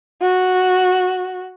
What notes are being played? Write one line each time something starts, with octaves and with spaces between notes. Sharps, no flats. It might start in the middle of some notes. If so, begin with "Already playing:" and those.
F#4